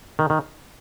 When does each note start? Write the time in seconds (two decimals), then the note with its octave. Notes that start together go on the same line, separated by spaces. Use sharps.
0.19 D#3
0.30 D#3